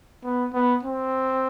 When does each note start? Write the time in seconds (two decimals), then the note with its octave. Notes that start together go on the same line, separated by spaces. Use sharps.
0.24 B3
0.54 B3
0.83 C4